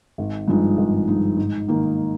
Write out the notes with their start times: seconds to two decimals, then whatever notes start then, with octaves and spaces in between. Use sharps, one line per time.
0.18 G#1
0.48 G2 F3 G#3 D#4
0.78 G#1
1.08 G2 F3 G#3 D#4
1.37 G#2
1.68 D#3 A#3